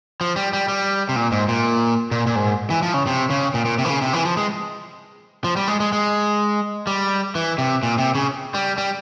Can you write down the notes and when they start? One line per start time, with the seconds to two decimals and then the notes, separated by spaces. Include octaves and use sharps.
0.21 F3
0.36 G3
0.53 G3
0.68 G3
1.09 C3
1.16 A#2
1.32 G#2
1.48 A#2
2.11 A#2
2.27 A#2
2.36 G#2
2.70 E3
2.82 F3
2.94 C#3
3.07 C3
3.30 C#3
3.54 A#2
3.65 A#2
3.78 C3
3.85 E3
3.89 C#3
4.02 C3
4.13 E3
4.25 F3
4.37 G#3
5.44 F3
5.57 G3
5.68 G#3
5.80 G#3
5.93 G#3
6.87 G3
7.35 E3
7.58 C3
7.83 A#2
7.98 C3
8.15 C#3
8.54 G3
8.78 G3